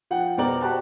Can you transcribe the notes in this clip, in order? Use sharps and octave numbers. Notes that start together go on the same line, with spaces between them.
F3 F#5 G5
F2 B2 C4 A#4 D5 F#7
F#4 G4 C5 A5 F#6